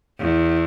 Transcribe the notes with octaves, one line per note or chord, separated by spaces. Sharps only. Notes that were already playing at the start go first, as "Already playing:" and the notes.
E2